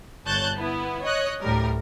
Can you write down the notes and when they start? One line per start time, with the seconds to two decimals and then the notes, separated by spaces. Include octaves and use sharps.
0.26 G1 C#5 A5 F#6 G6 A6
0.56 B3 E4
1.03 C#5 D#5 F#6
1.42 D2 A2 G3 A#4